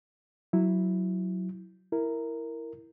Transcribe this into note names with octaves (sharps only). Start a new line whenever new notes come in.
F#3 E4
E4 A#4